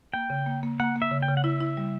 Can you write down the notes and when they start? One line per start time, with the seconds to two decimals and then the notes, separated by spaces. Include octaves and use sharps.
0.14 A#3 G5
0.30 C#3
0.46 A#3
0.63 A#3
0.80 A#3 F#5
0.96 A#3
1.02 E5
1.11 C#3
1.22 G5
1.29 C#3
1.37 F#5
1.44 E4 E5
1.60 E4
1.77 G3